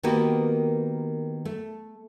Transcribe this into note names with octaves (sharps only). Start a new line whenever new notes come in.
D#3 A#3 B3 F#4 G4 B4
A3